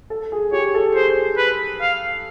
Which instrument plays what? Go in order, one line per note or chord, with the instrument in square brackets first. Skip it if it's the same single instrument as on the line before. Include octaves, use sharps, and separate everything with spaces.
[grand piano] A4
G#4
[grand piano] G4 [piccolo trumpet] C#5
[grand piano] A4
[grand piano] G#4 [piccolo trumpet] C5
[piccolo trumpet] B4
F5